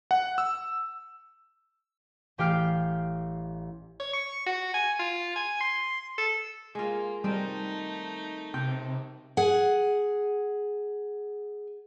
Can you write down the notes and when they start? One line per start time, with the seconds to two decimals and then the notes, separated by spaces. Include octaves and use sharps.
0.11 F#5
0.38 E6
2.38 A1 G4 F5 G5 F6 C7
4.00 C#5
4.14 C#6
4.46 F#4
4.74 G#5
4.99 F4
5.36 G#5
5.61 C6
6.18 A4
6.75 G#3 A#3 F4
7.24 D#3 G3 A3 C4 D#4
8.54 C3 G5
9.37 G#4 F#5